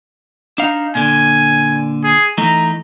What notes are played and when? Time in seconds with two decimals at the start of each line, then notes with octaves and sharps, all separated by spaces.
0.58 D4 D#4 F5
0.95 A#2 D3 G#5
2.04 G#4
2.38 E3 A3 D#4 A#5